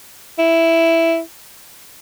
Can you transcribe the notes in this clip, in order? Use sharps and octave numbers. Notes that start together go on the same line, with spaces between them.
E4